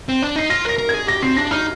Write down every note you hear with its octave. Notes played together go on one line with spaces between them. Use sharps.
C4
D4
D#4 C7
F4 A#6
A#4 A#6
A#4
G#4 G#6
G4 A#6
C4 C7
D4 A#6
D#4 F6